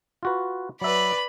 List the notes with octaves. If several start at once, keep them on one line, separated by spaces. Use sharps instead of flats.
F4 F#4 B4
F#3 B4 D5 E5 B5